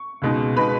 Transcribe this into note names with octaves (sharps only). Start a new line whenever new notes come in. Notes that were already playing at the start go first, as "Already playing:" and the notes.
Already playing: C#6
C#2 B2 G#3 D#4
B2 G#3 D#4 B4 B5